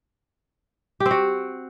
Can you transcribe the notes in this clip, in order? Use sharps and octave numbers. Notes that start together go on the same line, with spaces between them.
G4
C4
F#4